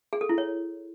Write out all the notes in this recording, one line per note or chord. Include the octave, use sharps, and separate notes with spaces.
G#4
A4
E4
C#5